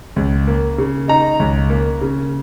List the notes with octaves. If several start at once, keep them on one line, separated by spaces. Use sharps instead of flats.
C#2
A#3
C#3
D#4 A#5
C#2
A#3
C#3